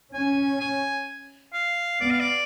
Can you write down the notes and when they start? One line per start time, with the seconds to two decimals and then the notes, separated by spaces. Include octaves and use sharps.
0.14 C#4 G#5
0.60 G#5
1.54 F5
2.01 B3 D5
2.11 F5
2.20 D5